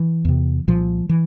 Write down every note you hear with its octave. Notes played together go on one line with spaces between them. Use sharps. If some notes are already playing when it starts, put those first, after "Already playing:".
Already playing: E3
E2 C3
C2 A#2 F3
E3